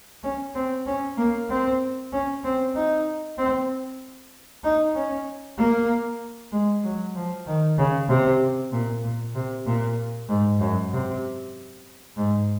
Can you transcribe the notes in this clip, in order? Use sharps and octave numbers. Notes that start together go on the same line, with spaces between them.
C#4
C4
C#4
A#3
C4
C#4
C4
D#4
C4
D#4
C#4
A#3
G#3
F#3
F3
D#3
C#3
C3
A#2
A#2
C3
A#2
G#2
F#2
C3
G#2